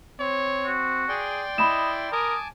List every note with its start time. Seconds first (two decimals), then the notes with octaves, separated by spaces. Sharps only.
0.20 C4 C#5
0.65 F#4
1.09 G#4 D5 G5 C6
1.58 E4 D#5 B5 E7
2.12 A#4 G#5 A5 D6 D#6